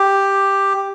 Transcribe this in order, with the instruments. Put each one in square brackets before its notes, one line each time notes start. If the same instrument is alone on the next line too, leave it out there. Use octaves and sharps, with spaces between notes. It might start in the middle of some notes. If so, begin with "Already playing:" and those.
Already playing: [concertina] G4